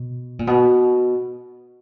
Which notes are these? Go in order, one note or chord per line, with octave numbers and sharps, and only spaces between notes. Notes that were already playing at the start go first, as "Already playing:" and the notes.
Already playing: B2
A#2
B2